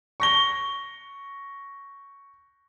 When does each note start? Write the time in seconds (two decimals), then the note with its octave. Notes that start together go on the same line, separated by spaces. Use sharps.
0.20 C#6 A#6 G7